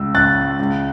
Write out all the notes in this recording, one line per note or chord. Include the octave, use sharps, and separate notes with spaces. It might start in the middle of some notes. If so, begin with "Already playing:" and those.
Already playing: C#2 E6
C#2 F#6 A6
C#2